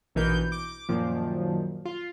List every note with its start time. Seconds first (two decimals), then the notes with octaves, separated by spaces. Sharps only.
0.15 A#1 B2 E3 D#4 A#4 G6
0.52 D6
0.89 F#2 A#2 D#3 F3
1.85 F4